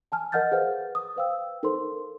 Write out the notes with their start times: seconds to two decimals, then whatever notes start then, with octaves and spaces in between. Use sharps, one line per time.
0.12 G#5 A5 F6
0.32 A#4 D#5 F#5 F6 G6 A6
0.52 G#4 B4 C5 F5 F#5
0.95 D#6
1.16 B4 C5 F5 G5 E6
1.63 D#4 A4 A#4 C5 C6